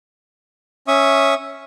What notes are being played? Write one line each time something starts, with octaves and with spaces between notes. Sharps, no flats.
C#4 E5 C#6 D#6